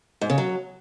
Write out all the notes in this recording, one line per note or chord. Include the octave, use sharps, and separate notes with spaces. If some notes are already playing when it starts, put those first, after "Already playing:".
G#2
C#3
F#3